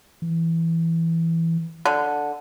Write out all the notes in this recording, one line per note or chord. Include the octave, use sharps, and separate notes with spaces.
E3
D3